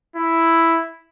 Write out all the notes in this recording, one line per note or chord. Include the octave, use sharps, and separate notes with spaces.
E4